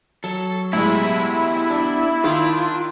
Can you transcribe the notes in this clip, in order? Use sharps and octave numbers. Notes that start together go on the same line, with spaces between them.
F#3 A4
A2 G#3 B3 E4 G4 E5
D4
D#3 D4 F4